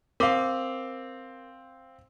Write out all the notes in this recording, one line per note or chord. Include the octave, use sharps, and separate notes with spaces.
C4 A#4 F5 D6